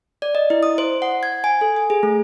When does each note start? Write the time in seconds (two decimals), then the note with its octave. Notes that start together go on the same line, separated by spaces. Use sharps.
0.22 D5
0.35 D#5
0.50 E4
0.63 D#6
0.78 C5
1.02 F#5
1.23 G#6
1.44 G#5
1.61 A4
1.76 G#5
1.90 G#4
2.03 A3